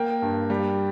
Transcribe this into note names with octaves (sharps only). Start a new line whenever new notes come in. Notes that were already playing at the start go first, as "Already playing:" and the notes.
Already playing: A#3 G5
G2
G3